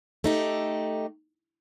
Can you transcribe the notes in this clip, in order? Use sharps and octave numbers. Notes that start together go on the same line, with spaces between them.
A3 D#4 G4